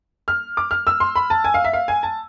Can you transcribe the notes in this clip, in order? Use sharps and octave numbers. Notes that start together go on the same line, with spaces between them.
F6
D6
F6
E6
C6
B5
A5
G#5
F5
E5
F5
G#5
A5